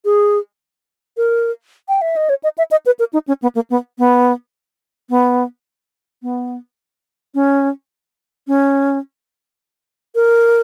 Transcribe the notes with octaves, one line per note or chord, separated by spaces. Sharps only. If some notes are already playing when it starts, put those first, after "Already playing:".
G#4
A#4
G5
E5
D#5
C#5
D#5
E5
D#5
B4
A#4
D#4
C#4
B3
A#3
B3
B3
B3
B3
C#4
C#4
A#4